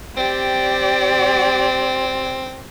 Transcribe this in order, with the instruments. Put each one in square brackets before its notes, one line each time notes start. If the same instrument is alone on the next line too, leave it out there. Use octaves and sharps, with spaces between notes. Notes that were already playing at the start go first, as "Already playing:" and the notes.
[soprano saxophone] C4 [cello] G4 D5